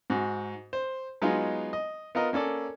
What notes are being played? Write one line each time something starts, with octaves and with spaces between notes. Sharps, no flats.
G#2 F#4
C5
F#3 G#3 B3 D#4 F4
D#5
B3 F4 A#4 D#5
A#3 C#4 A4 D5